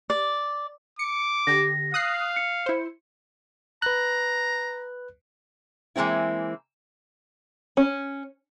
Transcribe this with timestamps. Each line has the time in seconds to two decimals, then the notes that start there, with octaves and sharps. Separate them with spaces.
0.10 D5
0.99 D6 C#7
1.47 D3 G4 A#6
1.94 F5 D#6 F#6 C7
2.36 C#7
2.66 E4 C5
3.82 B4 A#5 F#6
5.96 E3 G#3 A#3 C4 E4
7.77 C#4